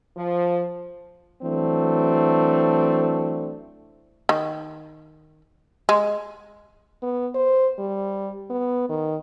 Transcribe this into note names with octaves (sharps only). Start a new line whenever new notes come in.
F3
E3 F#3 A3 C4 D4
D#3
G#3
B3
C5
G3
B3
D#3